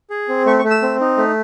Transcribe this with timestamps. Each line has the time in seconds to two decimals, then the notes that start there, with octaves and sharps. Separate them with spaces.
0.10 G#4
0.28 C4
0.46 A3 C#6
0.59 C#6
0.64 A3
0.70 E6
0.82 C4
1.00 D#4
1.17 A3